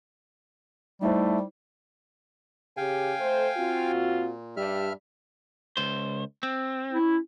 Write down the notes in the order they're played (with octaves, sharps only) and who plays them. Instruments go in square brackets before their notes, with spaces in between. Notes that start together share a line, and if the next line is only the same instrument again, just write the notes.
[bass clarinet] G3 [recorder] A3 [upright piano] D#4 E4 C5
[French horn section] C#3 G4 [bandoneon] F5 G5 G#5
[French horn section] A3 C5
C4 F4 F#4
[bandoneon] A#2
[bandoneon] G2 E5 F6 [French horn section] G3 D4
[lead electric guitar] C#2 C5
C4
[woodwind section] C#4 E4